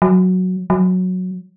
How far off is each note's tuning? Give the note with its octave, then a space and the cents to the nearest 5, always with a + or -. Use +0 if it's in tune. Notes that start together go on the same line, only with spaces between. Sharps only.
F#3 -5
F#3 -10